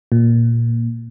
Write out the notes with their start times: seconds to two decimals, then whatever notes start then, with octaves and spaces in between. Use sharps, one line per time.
0.12 A#2